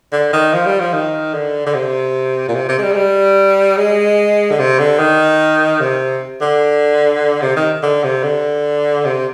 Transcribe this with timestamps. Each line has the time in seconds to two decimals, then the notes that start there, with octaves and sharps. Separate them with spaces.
0.12 D3
0.33 D#3
0.53 F3
0.66 G3
0.80 F3
0.93 D#3
1.34 D3
1.66 D3
1.74 C3
2.49 A#2
2.55 C3
2.69 C3
2.78 G#3
2.83 G3
2.93 G#3
2.96 G3
3.77 G#3
4.51 D3
4.59 C3
4.79 D3
4.99 D#3
5.80 C3
6.41 D3
7.42 C3
7.56 D#3
7.83 D3
8.04 C3
8.23 D3
9.05 C3